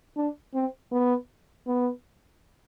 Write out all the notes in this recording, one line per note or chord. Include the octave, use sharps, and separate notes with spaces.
D4
C4
B3
B3